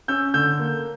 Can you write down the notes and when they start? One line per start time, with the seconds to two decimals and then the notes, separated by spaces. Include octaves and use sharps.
0.08 C#4 E6 G6
0.34 D3 E6 G6
0.59 A#3